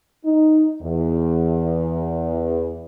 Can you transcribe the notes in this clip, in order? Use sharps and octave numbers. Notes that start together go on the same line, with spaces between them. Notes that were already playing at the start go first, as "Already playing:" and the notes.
D#4
E2